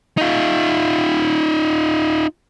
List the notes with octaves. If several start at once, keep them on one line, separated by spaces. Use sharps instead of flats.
D#4 F4